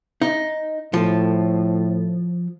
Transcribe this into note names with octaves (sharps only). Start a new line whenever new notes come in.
D#4
A2 F3